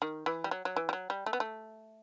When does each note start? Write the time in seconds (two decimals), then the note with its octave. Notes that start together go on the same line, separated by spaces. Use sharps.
0.02 D#3
0.26 E3
0.44 G3
0.51 F#3
0.65 F#3
0.76 E3
0.89 G3
0.93 F#3
1.10 G3
1.26 A3
1.33 B3
1.40 A3